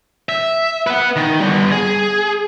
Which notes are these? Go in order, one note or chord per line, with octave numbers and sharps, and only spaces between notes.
E5
B4 F#5
D#3
G3 B3
G#4